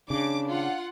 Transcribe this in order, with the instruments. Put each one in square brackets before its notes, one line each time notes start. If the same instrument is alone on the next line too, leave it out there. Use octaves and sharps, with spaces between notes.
[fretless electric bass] C#3 [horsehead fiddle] D4 [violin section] D6
[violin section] F4 F#5